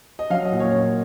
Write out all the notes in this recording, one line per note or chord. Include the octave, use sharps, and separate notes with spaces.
D#5
F#3 F5
D#5
A#2
C#5
A#3